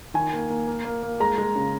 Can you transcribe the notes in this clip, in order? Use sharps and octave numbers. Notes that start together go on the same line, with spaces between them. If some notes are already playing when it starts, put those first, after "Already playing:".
D#3 G#5
A#3
A#3
A#3
A#3
A#3
G#3 A#5
G#3
C#3